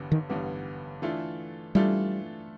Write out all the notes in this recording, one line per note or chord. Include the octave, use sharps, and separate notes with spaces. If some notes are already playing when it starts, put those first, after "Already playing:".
Already playing: A1 G2 D3 G3 B3
D#3
A1 G2 D3 G3 B3
E3 A3 D4 F4 A4
E3 G3 A3 D4 F4 A4